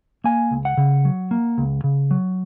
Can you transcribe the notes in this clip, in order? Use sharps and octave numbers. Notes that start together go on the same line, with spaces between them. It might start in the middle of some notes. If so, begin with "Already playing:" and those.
A#3 G#5
C#2
F#5
C#3
F#3
A#3
C#2
C#3
F#3